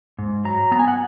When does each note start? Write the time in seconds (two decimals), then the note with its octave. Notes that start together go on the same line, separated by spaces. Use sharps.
0.19 G#2
0.45 F#3 A#5
0.71 B3 A#5
0.79 G#5
0.88 F#5